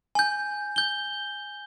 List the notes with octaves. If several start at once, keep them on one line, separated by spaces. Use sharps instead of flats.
G#5 G6
G6 G7